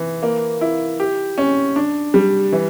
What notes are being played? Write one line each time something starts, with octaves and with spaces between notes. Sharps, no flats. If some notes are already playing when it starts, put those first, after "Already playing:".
Already playing: E3
A#3
E4
G4
C#4
D4
G3
E3